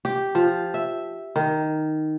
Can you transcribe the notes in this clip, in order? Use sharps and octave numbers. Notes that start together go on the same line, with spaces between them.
G4
F3
E5
D#3